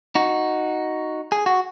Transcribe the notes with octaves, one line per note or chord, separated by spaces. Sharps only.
D#4 F#4
G#4
F#4